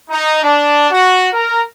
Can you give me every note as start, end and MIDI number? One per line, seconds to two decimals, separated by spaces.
0.10 0.42 63
0.42 0.90 62
0.91 1.28 66
1.33 1.61 70